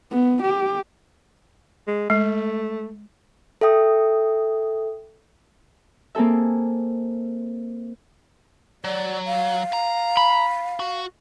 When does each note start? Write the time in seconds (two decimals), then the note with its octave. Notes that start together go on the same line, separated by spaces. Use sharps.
0.11 B3
0.42 G4
1.88 G#3
2.10 G#3 A3
3.61 A4 E5 G5 D#6
6.15 A#3 C4 G#4 A4 E5
8.84 F#3 D5
9.26 F5
9.73 A#5
10.17 B5
10.80 F#4